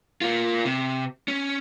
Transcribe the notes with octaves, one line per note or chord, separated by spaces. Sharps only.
A#3 F4
C3
C#4